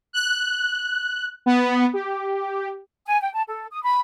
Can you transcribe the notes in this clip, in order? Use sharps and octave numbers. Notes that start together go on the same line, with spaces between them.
F#6
B3
G4
G#5
G5
A5
A4
D#6
B5